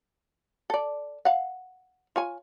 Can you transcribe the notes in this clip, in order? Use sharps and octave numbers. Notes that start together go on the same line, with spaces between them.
A4 D5
F5 F#5
F4 C#5 G#5